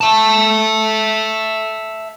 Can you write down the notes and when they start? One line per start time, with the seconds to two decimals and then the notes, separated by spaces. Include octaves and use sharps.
0.01 E5 A5